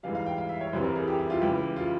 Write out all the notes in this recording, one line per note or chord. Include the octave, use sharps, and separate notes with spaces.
G#2 E3 G3 F5
F5
G5
F5
E5
C#5
C2 C3 E3 G3 C5
A#4
G#4
G4
E4
F4
C#2 C#3 E3 G4
F4